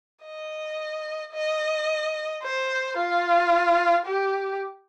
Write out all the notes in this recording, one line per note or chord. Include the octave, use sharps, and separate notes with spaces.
D#5
D#5
C5
F4
G4